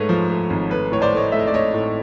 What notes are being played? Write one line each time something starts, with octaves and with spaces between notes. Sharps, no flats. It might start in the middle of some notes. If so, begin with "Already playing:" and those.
Already playing: G#2 A3 B4 C#5
F3
A3
G#1
A3 B4
A2 C#5
C5 D5
A3 C#5 D#5
A3 E5
D#5
D5
A3 C#5 D#5
A2